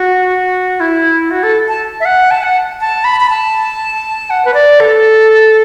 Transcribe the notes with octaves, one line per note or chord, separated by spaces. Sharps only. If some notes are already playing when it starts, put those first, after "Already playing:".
Already playing: F#4
E4
F#4
A4
A5
E5
F#5
A5
F#5
A5
B5
B5
A5
F#5
B4
D5
A4